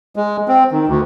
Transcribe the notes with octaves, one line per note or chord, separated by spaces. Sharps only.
G#3
C4
D#3
D2